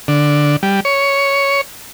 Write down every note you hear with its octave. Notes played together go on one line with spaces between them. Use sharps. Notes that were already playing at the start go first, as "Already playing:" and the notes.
D3
G3
C#5